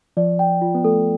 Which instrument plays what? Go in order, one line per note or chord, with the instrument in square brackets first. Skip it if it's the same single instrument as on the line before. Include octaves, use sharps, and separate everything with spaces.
[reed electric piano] F3 [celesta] D5
[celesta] G5
F4
[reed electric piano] B3
[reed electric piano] A3 [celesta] A4